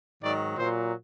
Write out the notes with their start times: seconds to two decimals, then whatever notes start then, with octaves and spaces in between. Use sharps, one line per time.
0.22 G#2 D#3 F#3 D5
0.57 A#2 C5
0.62 F#3